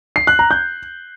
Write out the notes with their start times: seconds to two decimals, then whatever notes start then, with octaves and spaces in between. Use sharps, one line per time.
0.16 C7
0.27 F#6
0.39 A#5
0.51 G6